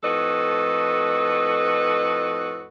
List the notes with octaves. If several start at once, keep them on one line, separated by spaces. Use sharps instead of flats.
F2 A2 F#4 A4 B4 D#5